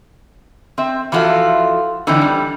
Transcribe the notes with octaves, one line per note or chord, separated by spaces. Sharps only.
C4 E5
E3 F3 F4 F#4 A4 E5
D3 E3 A3 C4 D#4 E4
G3